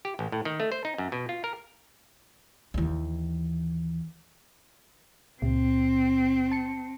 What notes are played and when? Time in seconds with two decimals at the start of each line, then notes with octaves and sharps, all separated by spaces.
0.05 G4
0.19 A1
0.32 A2
0.45 D#3
0.60 A3
0.72 C5
0.85 D#4
0.98 F#2
1.12 B2
1.29 F4
1.44 A#4
2.74 D#2 E3
5.42 C#2 A#2 C4
6.51 A5 C#7